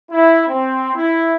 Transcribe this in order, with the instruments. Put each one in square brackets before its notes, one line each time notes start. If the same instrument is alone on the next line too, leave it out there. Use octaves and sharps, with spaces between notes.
[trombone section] E4
C4
E4